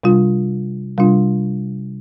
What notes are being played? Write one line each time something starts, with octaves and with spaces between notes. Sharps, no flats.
C3 G3 D4 F4
C3 G3 D4 F4